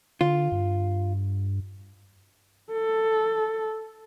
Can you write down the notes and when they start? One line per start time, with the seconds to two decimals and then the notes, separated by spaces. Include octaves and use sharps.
0.21 D3 F4
0.52 G2
2.72 A4